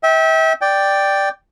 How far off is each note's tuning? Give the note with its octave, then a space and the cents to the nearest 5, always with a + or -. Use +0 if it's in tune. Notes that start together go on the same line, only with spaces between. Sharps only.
E5 -35 G5 +0
D5 +0 G5 +0